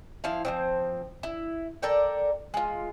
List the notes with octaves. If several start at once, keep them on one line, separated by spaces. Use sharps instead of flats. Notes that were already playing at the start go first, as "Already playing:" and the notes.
F3 E4 F5
F3 F#3 C4
E4
A4 A#4 D5 G5
G#3 F4